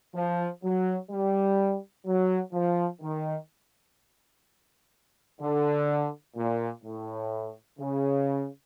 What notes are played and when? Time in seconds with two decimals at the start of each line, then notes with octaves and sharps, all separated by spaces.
0.14 F3
0.63 F#3
1.10 G3
2.06 F#3
2.53 F3
3.02 D#3
5.41 D3
6.36 A#2
6.83 A2
7.79 C#3